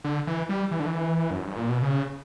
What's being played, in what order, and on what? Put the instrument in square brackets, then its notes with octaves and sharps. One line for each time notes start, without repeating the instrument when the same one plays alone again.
[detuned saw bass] D3
E3
G3
E3
D3
E3
F#2
G2
A#2
B2
C#3